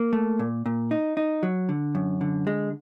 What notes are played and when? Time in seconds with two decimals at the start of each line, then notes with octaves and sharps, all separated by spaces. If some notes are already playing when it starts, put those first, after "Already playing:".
Already playing: A#3
0.13 A3
0.39 A#2
0.66 A#2
0.91 D#4
1.17 D#4
1.43 F#3
1.69 D3
1.95 F#2
2.21 D3
2.47 G#3